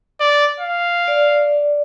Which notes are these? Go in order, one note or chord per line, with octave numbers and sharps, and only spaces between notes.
D5
F5
D5